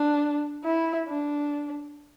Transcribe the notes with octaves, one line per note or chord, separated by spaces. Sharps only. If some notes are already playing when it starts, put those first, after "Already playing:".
Already playing: D4
E4
D4